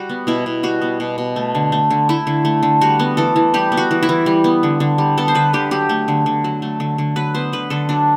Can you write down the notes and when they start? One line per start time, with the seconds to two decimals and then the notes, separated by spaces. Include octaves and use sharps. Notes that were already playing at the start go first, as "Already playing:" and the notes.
Already playing: G3 F#4
0.09 B3
0.27 B2 E4
0.46 B2
0.63 G3 F#4
0.82 B3
1.00 B2
1.18 B2
1.36 A3
1.55 D3
1.72 A3
1.90 D3
2.09 A3 E4
2.27 D3
2.45 A3
2.63 D3
2.81 G3 F#4
2.99 B3
3.17 E3 A4
3.36 E3
3.54 G3 G4
3.72 B3
3.77 F#4
3.91 E3
4.03 E4
4.09 E3
4.26 G3
4.44 B3
4.63 D3
4.80 D3
4.98 G3
5.17 B3 A4
5.28 C5
5.35 D3 B4
5.53 D3 G4
5.71 F#3 G4
5.89 A3
6.08 D3
6.26 D3
6.44 F#3
6.62 A3
6.80 D3
6.98 D3
7.16 F#3 B4
7.35 B3 C5
7.53 D3 B4
7.70 D3 A4
7.89 F#3 D4